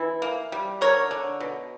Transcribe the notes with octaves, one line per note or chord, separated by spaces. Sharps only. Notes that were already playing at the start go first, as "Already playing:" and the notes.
Already playing: E3 E4
A#3
G3
D3 A#4 C#5
D3
B2